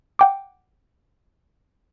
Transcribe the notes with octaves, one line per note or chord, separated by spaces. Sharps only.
F#5 G5 D6